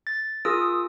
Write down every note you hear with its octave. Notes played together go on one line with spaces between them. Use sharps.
A6
F4 G#4 A#4 D#6 E6